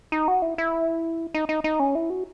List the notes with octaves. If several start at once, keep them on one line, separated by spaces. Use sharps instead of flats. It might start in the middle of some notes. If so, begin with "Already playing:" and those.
D#4
F#4
E4
E4
D#4
D#4
D#4
C#4
E4
F#4